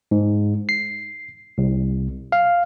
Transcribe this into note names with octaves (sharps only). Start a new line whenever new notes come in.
G#2
C7
C2
F5